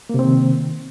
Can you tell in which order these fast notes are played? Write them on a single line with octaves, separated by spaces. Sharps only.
A#3 C3 C4 D#3